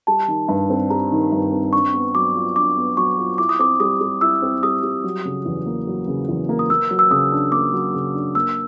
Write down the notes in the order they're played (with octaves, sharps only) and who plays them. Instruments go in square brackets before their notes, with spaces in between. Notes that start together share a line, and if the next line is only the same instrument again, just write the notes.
[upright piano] G3 [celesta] A5
[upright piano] D#3
G2
C4
[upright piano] G3 [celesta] A#5
[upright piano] D#3
G2
C4
[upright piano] D4 [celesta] C#6
[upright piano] B3
[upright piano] F#3 [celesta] D6
[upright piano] F4
[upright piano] D4 [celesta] D6
[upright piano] B3
[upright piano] F#3 [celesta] C#6
[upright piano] F4
[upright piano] E4 [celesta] D6
[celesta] D#6
[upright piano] C4 [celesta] D6
[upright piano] G3 [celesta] D#6
[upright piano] G3
[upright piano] E4 [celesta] E6
[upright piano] C4
[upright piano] G3 [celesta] D#6
[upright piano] G3
F#3
C#3
E2
A#3
F#3
C#3
E2
A#3
[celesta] D#6
[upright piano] A#3 [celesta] E6
[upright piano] F#3
[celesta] E6
[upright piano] C#3 [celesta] D#6
[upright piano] D4
[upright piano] A#3 [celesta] D6
[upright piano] F#3
C#3
D4
[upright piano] A#3 [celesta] E6